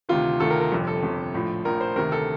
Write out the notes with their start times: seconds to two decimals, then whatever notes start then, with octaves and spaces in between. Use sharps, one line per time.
0.09 D2 C3 D#3 F4
0.40 D2 C3 D#3 A4
0.50 A#4
0.60 A#4
0.71 G1 F2 C3
0.87 A4
1.03 G1 F2 C3
1.34 A#1 A2 F3
1.65 A#1 A2 F3 A#4
1.81 C5
1.96 D2 C3 D#3 A#4
2.12 A4